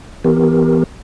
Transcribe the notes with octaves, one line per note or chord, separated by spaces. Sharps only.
E3 B3 G4 A#4